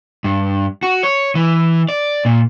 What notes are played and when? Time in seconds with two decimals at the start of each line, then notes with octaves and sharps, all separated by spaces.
0.24 G2
0.83 F#4
1.03 C#5
1.35 E3
1.89 D5
2.25 A#2